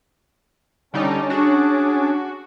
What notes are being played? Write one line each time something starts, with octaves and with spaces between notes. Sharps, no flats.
D3 G3 C#4 D#4 A5 D6
D4 F#4 G#4